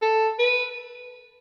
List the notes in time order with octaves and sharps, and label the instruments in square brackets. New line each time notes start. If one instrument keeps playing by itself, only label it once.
[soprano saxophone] A4
B4